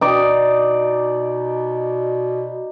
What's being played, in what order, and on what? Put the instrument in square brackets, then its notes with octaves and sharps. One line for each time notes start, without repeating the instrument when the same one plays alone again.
[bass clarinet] B2 [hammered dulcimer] D#4 D5